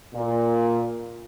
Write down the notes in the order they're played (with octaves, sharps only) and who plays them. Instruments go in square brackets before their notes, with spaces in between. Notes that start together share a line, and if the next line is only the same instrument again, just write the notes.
[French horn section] A#2